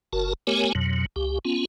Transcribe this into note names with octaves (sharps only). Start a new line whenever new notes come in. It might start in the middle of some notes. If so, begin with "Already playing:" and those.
F#1 F#4 A#4 A5
A3 B3 G4 A#4 C#5 G#5
F2 B2 F#3
C#2 G4
B3 C#4 F4